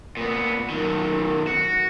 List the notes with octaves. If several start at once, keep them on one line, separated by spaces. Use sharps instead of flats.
A#2 B3
F#2 D#3
F#4